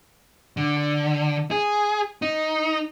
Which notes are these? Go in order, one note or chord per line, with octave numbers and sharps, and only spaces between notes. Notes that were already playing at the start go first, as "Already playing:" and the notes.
D3
G#4
D#4